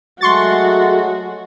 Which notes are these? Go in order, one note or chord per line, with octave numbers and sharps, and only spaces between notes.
F#3 G#3 A3 F#4 C6 C#6 A6